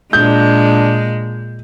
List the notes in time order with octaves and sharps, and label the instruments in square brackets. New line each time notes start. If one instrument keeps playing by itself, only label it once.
[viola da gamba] A#2 G#3 [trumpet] D4 [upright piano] G6